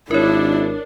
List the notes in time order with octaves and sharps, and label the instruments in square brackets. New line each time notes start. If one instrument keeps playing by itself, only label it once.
[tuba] G#1 [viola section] D4 [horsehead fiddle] E4 [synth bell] A#4 C#5